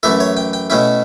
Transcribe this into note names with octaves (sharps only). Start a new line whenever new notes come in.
F#2 E3 A3 E4 A4
C#5
G5
G5
B2 A3 C#4 E4 G5